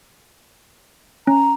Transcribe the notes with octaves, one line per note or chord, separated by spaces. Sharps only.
C#4 A#5